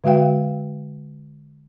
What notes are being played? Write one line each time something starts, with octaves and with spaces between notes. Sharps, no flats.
D3 G#3 F#4 F5 G5